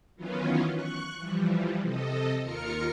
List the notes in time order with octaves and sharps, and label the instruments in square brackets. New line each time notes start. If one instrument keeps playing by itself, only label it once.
[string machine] D#3 E3 F#3 B3 C#4 F4
C#6 F#6
E3 F3 G3
C3 A4 D#5
D#2 F4 A#4 F6 C#7